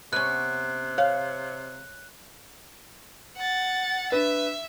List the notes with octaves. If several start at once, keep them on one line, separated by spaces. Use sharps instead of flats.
C3 B3 C#4 F#6
C#5 F5
F#5 A6
D4 B4 E5